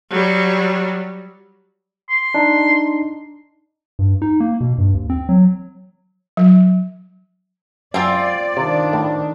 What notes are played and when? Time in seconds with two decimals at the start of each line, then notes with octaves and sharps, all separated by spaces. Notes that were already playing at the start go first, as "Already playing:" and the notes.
0.10 F#3 G3
2.10 C6
2.34 D4 D#4
3.99 G2
4.22 D#4
4.40 A#3
4.61 B2
4.78 G2
4.94 D#2
5.10 C4
5.29 F#3
6.37 F#3
7.94 F#2 C4 F4 D5
8.57 C3 D#3 D4
8.93 A2